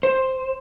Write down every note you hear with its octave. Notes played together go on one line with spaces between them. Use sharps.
C5